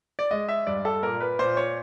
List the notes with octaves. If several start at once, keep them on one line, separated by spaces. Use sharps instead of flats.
D5
G#3 D#5
E5
G2 D5
A4
A#2 A#4
B4
A#2 C5
C#5